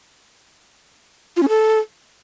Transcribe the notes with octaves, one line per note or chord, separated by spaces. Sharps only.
F4
C#4
A4